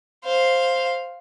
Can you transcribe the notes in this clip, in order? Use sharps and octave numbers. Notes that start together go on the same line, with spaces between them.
C5 F5